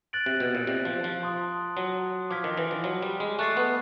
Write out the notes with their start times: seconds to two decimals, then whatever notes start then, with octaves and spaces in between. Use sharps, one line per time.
0.13 F#6 A6 D7 F#7
0.26 C3
0.40 B2
0.55 A#2
0.67 C3
0.85 F3
1.04 F3
1.22 A5 C6 D#6
1.77 F#3
2.30 F3 D6 F6 G#6 B6
2.44 D#3
2.57 E3
2.71 F3
2.84 F#3
3.02 G3
3.20 G#3
3.39 A3 C#6 F#6 A6 C7
3.57 B3